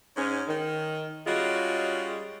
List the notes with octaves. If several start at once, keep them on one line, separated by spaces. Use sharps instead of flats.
G#2 C#4
D#3
G3 G#3 C#4 F4 F#4